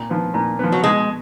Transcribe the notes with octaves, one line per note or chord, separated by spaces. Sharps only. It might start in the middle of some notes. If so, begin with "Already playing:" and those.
Already playing: A#2
F3 B3
A#2
F3 B3
F#3
B2 G#3